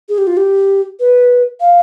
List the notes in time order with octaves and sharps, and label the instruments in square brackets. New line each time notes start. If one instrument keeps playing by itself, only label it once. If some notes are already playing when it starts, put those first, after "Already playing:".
[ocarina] G#4
G4
F4
G4
B4
F5